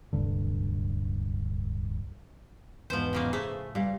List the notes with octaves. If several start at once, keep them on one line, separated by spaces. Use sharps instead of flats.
D1 C2 G2 D3
E2 G#2 B2 F3 C5
A2 C#3 A#3
A3 G#4 C5
A#2 G3 F5